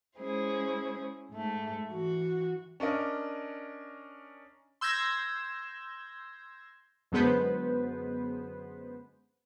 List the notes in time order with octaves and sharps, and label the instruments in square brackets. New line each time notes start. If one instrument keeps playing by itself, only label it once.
[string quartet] G#3 C#4 E4 G#4 C5
G#2 A3
E3 F#4
[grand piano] C#4 D4 A#4 D#5
[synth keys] C6 E6 G6 G#6 A#6
[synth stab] F#2 D3 G#3 B3 B4 C5